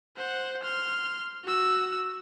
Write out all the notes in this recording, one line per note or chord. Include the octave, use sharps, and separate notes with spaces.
C5 F#5
C6 F6
F#4 E6